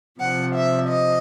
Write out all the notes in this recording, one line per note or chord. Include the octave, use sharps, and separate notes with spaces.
C3 F3 F#5
E5
D#5